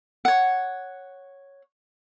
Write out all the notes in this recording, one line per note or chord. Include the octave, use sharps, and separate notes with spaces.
C#5 F#5